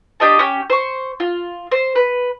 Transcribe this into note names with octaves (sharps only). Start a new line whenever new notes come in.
D4 G4 D#5 A5
C#4 G4
C5 C#6
F4
C5
B4